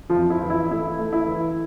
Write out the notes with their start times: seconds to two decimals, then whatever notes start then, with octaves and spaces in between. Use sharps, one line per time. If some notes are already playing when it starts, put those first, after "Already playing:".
0.10 F3 F4
0.16 F2
0.30 E4
0.43 E3
0.50 E4
0.71 A3 E4
0.99 A3
1.13 E4
1.27 E3